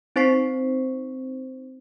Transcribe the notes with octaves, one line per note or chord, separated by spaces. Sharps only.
C4 D#4 C5 C#6 B6 C7